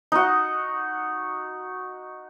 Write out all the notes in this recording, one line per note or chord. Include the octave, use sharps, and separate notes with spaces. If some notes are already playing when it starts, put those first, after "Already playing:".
D#4 F#4